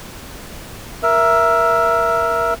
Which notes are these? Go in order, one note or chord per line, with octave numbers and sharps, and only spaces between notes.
A#4 E5